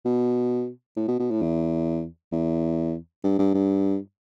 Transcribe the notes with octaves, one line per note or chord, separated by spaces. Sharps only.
B2
A2
B2
B2
A2
E2
E2
G2
G2
G2